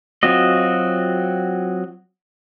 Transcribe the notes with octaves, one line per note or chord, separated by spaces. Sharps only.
F#3 C4 F4 F#4 D#5